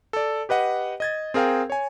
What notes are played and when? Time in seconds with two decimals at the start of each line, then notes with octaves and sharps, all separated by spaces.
0.13 A4 D5
0.49 G4 B4 D#5 F#5
1.00 D#5 G#6 A6
1.34 C4 G#4 A#4 F5 G5
1.70 C#5 G#5